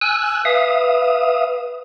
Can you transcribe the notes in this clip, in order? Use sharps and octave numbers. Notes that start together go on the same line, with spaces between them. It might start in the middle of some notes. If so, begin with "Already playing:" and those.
G#5 E6 F#6
B4 E5 F5 D#6